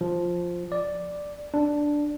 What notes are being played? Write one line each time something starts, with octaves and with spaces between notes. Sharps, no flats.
F3
D5
D4